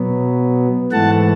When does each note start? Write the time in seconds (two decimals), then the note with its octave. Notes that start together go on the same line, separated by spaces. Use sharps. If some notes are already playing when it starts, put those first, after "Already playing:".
Already playing: B2 F#3 B3
0.92 G#2 E3 A3 F#5 A5